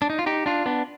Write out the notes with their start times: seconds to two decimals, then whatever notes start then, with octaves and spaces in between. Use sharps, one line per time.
0.02 D4
0.10 D#4
0.19 F4
0.26 D#4 G4
0.46 D4 F4
0.66 B3 D4